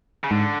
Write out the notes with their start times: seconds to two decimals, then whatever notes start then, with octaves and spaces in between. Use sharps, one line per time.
0.24 C#3
0.31 G#2 D3